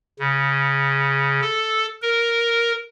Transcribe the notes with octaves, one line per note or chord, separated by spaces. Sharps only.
C#3
A4
A#4